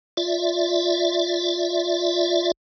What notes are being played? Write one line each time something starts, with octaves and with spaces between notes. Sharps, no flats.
F4 D5 E5